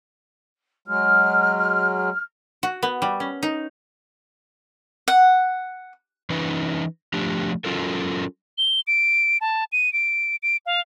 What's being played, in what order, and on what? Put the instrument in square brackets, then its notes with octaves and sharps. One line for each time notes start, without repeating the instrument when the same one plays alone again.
[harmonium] F#3 G#3 [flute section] F6
[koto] F#4
B3
G3
C#4
D#4
[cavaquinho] F#5
[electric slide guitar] E3 C#4 D#4 B4
F3 A3 D4 G4
F#3 C#4 F4 A4 A#4
[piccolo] G7
D7
A5
D#7
D7
D7
F5